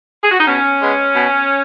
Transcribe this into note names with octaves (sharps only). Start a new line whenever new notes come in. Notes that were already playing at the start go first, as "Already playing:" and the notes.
G#4
F#4
D#4
B2 C#4
G#3 B3
B2